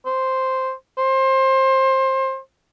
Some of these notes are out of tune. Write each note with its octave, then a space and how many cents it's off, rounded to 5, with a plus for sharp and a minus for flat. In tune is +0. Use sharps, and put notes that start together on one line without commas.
C5 +0
C5 +25